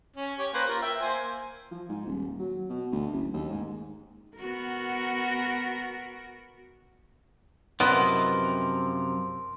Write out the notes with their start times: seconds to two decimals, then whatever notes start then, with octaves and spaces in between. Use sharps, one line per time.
0.16 C#4
0.39 G4 C#5
0.54 A#3 B4 C5
0.69 F4 A#4
0.82 E5 G5
1.01 A#3 C5 G#5
1.71 F3
1.89 G#2
2.06 D#1
2.39 F#3
2.69 B2
2.92 D2
3.12 F#1
3.33 D#2
3.49 G#2
4.37 B3 F#4 A#4
7.80 F#2 C3 F3 B3 E4 A#4 D#5 C6